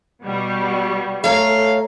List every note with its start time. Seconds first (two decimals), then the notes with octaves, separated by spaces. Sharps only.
0.23 B2 G3
1.24 A3 A4 C#5 F5 A#5